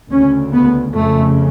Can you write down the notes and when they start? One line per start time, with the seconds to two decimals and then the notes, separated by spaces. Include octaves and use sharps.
0.11 D2 C#3 C#4
0.53 B3
0.96 F2 C#3 A3